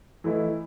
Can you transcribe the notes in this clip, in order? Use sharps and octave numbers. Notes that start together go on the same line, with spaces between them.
E3 A3 E4 B4 D#5